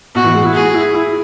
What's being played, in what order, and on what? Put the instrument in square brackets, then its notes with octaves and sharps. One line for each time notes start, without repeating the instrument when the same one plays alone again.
[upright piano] B2 [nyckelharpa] F#4
[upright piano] E3
G#3
E4
[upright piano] F#4 [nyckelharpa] G#4
[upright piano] E4
E4